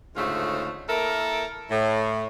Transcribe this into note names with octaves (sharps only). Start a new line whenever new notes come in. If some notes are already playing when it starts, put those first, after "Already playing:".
D2 G#2 C#3 A3 F4
A#3 E4 A4 A#4
A2